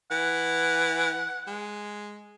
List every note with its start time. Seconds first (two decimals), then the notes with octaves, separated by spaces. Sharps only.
0.11 E3 F#5
1.47 G#3